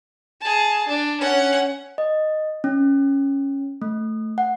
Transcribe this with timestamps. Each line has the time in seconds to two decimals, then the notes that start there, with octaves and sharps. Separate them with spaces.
0.41 G#4 A5
0.88 D4
1.21 C#4 F#5
1.98 D#5
2.64 C#4
3.82 A3
4.38 F#5